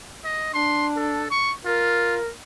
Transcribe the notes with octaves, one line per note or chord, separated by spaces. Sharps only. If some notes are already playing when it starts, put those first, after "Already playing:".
D#5
D4 C6
A4
C#6
F4 A#4